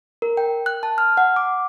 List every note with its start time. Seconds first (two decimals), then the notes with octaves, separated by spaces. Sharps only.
0.22 A#4
0.37 G5
0.66 F#6
0.83 A5
0.98 F6
1.17 F#5
1.36 D6